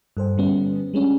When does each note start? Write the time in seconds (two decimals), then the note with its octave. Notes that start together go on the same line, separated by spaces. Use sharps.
0.17 G2 A4 C5 G5
0.37 D3 G3 B3 C#4
0.94 G3 G#3 C#4 D4